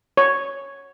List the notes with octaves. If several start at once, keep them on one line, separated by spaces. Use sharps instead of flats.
C#5